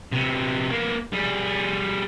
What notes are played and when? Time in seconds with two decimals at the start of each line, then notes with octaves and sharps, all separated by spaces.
0.12 C3 B3
0.70 A#3 B3
1.13 G3 G#4